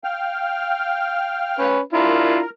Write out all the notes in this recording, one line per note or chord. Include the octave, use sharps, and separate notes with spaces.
F5 G5 F6
C#4 B4
D4 E4 F4 A#4